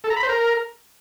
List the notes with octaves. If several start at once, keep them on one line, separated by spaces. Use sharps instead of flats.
A4
A#5
B5
C5
A#4